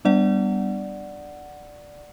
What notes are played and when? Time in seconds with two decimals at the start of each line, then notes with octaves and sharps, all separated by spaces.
0.05 G3 B3 D4 D5 F#5